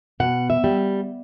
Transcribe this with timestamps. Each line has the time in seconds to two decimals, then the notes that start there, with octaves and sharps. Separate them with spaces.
0.20 B2 F#5
0.50 E5
0.64 G3